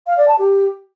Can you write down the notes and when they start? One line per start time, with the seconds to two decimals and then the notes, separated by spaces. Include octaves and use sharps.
0.06 F5
0.17 D5
0.28 A5
0.38 G4